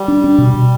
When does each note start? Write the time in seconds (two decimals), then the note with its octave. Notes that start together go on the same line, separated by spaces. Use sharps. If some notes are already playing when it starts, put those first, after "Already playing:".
Already playing: G3
0.08 D4
0.24 D4
0.38 B2
0.54 B2